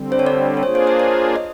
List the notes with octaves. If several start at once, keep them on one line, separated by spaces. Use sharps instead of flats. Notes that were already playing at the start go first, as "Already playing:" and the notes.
Already playing: D3 G3 C4
C5
C#5
D5
C#5
A#3 D4 F4 G#4 C5
C5
C5
C#5
D#5